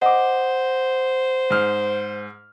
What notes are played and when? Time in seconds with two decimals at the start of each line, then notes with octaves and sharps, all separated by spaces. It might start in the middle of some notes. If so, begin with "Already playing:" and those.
0.02 C5 D#5 F#5 D6
1.50 G#2 F6